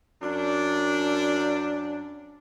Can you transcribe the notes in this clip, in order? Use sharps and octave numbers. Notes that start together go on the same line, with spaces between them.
F#2 D4